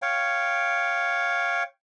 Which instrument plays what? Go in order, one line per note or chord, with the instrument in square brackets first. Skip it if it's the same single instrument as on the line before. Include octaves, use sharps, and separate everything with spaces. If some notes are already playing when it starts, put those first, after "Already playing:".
[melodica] C#5 F5 G5